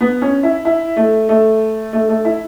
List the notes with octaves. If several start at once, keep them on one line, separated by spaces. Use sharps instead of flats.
B3
C#4
E4
E4
A3
A3
A3
A3
E4